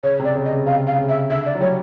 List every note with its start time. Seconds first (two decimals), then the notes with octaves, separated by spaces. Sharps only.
0.03 C#3 C#5
0.19 C3 D5
0.35 C#3
0.45 D#5
0.51 C#3
0.66 C3 F5
0.87 F5
0.98 C#3
1.09 E5
1.30 D3 E5
1.46 D5
1.55 F#3
1.61 G3 C#5